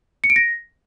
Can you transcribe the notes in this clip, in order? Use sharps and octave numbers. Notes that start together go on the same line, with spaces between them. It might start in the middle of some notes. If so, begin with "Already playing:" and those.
C#7
D7
A#6